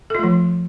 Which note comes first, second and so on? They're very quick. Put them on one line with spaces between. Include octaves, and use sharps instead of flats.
A4 F4 A3 F3